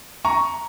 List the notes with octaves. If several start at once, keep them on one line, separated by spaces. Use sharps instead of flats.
A#5 C#6